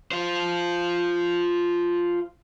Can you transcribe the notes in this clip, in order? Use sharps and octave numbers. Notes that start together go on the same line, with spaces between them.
F4 C5